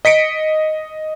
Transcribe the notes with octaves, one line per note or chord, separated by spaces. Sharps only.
D#5 B6 C#7 D7